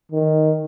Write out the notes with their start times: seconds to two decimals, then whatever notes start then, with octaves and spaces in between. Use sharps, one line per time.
0.12 D#3